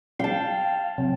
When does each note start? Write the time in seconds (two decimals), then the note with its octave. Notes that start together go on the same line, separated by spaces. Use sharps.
0.19 F5 G5 A5
0.98 C3 F#3 C4